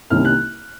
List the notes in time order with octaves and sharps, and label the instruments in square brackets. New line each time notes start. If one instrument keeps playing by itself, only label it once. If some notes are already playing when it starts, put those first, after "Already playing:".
[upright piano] C2 C3 D#3 A#3 C#4 F6
F#6